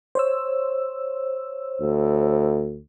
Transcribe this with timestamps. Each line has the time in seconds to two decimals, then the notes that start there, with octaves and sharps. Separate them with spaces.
0.15 C5 C#5 E6
1.81 D2